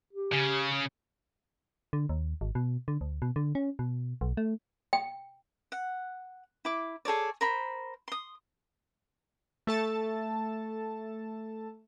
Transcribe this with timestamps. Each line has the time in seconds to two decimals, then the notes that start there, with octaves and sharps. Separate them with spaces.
0.13 G4
0.33 C#3
1.93 D3
2.09 D#2
2.41 G#1
2.55 B2
2.88 D3
3.01 D2
3.22 B2
3.36 D3
3.55 C#4
3.79 B2
4.21 B1
4.37 A3
4.93 G5
5.72 F#5
6.65 E4 D6
7.05 G#4 A4 C#5 D5
7.41 A#4 C5 B5
8.08 C6 D#6
9.67 A3 A4 A5